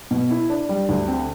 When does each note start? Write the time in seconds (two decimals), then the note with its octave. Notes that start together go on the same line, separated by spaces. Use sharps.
0.11 B2
0.31 E4
0.50 D4
0.69 G3
0.89 D2
1.08 C4